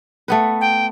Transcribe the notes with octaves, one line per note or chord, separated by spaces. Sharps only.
A3 B3 B4
G5